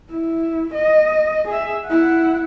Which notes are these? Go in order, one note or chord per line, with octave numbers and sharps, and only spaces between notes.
E4
D#5
G#4 E5
E4 F#5